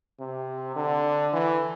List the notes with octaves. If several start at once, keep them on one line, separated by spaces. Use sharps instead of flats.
C3
D3
E3